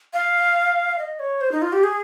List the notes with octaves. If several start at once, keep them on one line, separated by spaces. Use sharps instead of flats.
F5
D#5
C#5
C5
D#4
F4
G4
G#4